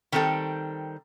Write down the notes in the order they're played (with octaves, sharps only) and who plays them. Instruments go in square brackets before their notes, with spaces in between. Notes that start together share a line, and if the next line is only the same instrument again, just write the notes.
[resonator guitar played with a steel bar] D#3 G3 C4 A4 G5